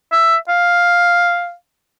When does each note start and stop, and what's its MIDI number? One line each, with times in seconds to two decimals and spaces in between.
0.12 0.36 76
0.49 1.53 77